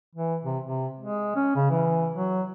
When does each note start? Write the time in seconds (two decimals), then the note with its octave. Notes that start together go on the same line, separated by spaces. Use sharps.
0.15 E3
0.44 C3
0.65 C3
1.00 G#3
1.36 C#4
1.55 C#3
1.70 E3
2.14 F#3